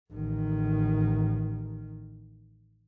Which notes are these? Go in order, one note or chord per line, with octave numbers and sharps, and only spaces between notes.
A1 D#3